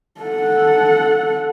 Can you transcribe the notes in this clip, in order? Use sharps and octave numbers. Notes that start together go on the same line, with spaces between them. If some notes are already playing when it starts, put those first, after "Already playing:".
A4 F#5